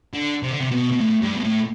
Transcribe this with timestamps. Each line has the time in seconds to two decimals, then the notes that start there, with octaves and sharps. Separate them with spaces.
0.13 D3
0.43 C3
0.51 D3
0.60 C3
0.71 B2
0.92 B2
1.01 A2
1.22 G2
1.36 B2
1.44 A2